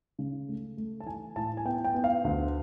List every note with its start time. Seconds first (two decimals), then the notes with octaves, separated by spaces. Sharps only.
0.19 C#3
0.49 A3
0.77 A3
1.00 A5
1.06 E3 G#5
1.36 A2 A5
1.57 G#5
1.65 B3 G5
1.84 G5
1.94 B3
2.04 F5
2.24 D2